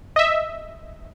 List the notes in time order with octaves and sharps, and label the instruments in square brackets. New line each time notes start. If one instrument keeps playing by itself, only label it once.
[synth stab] D#5 E5